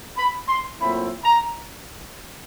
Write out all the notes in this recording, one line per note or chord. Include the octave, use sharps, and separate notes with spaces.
B5
C6
A#2 F#3 A3 C4 E4 B5
A#5